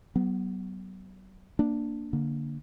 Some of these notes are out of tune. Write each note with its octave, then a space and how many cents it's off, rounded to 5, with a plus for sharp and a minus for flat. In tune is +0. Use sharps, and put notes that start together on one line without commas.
F#3 +40 B3 +0
A#3 -5 D4 +0
D3 -5 A#3 +0